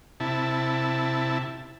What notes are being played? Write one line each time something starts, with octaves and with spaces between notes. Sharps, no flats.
C3 E4 A5